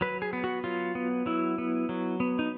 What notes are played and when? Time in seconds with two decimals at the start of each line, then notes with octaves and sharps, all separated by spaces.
0.01 F#3 B4
0.22 G#4
0.33 B3
0.44 F#4
0.64 F#3 F4
0.95 B3
1.26 F#3 E4
1.58 B3
1.89 F#3
2.20 B3
2.39 D#4